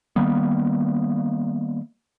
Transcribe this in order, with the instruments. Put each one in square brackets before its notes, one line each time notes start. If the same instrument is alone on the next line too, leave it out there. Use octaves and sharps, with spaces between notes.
[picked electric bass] D#3 G3 A#3 B3